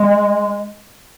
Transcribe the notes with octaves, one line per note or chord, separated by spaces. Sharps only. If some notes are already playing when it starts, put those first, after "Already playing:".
Already playing: G#3